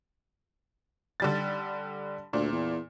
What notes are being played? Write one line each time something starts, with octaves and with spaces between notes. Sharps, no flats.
D3 G3 A6
D2 A#2
E2